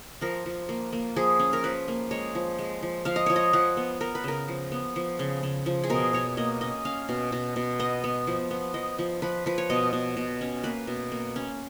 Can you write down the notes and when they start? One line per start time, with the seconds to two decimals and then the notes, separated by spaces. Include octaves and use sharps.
0.21 F3 A#4
0.46 F3
0.69 A#3
0.92 A#3
1.16 F3 G#4
1.39 C#4
1.53 A#4
1.64 F3 B4
1.88 A#3
2.11 G#3 C#5
2.35 F3
2.59 G#3
2.83 F3
3.05 F3 F5
3.16 D#5
3.26 F3 C#5
3.36 D#5
3.53 F3 F#5
3.77 B3
4.01 B3 A#4
4.15 B4
4.24 C#3 A#4
4.48 F3
4.72 B3
4.96 F3
5.19 C#3
5.43 C#3
5.66 F3
5.84 G#4
5.90 B2 A#4
6.13 B2 C#5
6.37 A#3 D#5
6.61 C#4 D#5
6.85 C#4 F5
7.09 B2
7.32 B2
7.56 B2
7.79 B3 D#5
8.04 B3
8.27 F3
8.51 B3
8.74 F3 D#5
8.98 F3
9.22 F3 B4
9.46 F3 B4
9.58 C#5
9.70 B2 D#5
9.93 B2
10.17 B2
10.41 C#4
10.63 A#3 B4
10.87 B2
11.12 A#3
11.36 C#4